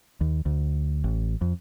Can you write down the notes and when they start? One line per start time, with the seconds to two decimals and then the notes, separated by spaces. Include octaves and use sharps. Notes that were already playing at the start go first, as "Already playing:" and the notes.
0.21 D#2
0.46 D2
1.04 A1
1.41 F2